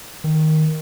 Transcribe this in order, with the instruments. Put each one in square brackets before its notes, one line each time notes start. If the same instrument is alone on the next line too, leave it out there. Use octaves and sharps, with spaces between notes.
[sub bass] D#3